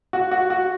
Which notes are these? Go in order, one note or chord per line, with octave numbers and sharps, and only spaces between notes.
F#4
F#4
F#4